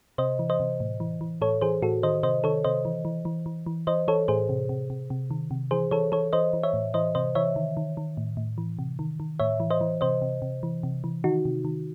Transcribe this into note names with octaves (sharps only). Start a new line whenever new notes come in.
C3 C5 D#5
E3
C5 D#5
C3
A2
E3
E3
A2 A4 C#5
E3 G#4 C5
A2 F#4 A4
D#3 C5 D#5
C3 C5 D#5
D#3 A4 C#5
C3 C5 D#5
E3
E3
E3
E3
E3
E3 C5 D#5
E3 A4 C#5
A2 G#4 C5
C3
C3
C3
C3
D#3
C3
E3 G#4 C5
E3 A4 C#5
E3 A4 C#5
E3 C5 D#5
E3
C#5 E5
A2
E3 C5 D#5
C3 C5 D#5
E3 C#5 E5
D#3
D#3
D#3
A2
A2
E3
C3
D#3
D#3
A2 C#5 E5
E3
C5 D#5
E3
C3 C5 D#5
C3
C3
E3
C3
E3
D#3 D#4 F#4
C3
D#3